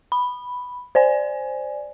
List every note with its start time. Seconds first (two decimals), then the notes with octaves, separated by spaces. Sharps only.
0.12 B5
0.95 C5 D5 G#5